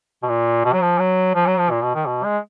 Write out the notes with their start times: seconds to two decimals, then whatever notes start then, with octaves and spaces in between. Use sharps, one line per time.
0.23 B2
0.29 A#2
0.64 B2
0.73 F#3
0.82 F3
0.99 F#3
1.35 F3
1.47 F#3
1.59 F3
1.71 A#2
1.83 B2
1.95 D#3
2.07 B2
2.24 G#3